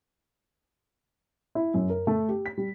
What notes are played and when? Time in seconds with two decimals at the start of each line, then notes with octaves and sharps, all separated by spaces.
1.55 E4
1.74 F#2
1.90 A#4
2.07 A3
2.29 G4
2.46 B6
2.58 G3